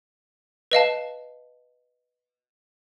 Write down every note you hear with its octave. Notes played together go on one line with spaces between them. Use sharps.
B4 D#5 F5 A5